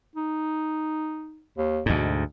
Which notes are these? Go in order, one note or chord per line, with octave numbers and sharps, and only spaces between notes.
D#4
D#2
D2 G#2 B2